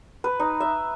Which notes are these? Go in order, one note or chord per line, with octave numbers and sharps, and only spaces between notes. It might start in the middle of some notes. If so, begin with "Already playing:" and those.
B4
D#4
E5